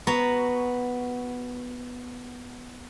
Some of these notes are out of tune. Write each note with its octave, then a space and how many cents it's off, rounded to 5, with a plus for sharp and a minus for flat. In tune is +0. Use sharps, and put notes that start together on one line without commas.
B3 +0 F#4 +0 A#5 +0